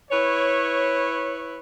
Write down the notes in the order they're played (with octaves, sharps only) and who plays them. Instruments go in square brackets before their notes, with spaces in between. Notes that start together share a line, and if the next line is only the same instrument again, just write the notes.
[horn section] E4 B4 C#5